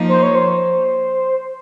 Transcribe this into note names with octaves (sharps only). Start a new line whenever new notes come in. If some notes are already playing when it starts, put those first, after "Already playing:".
Already playing: F3 A#3 D#4
C5
C#5
C5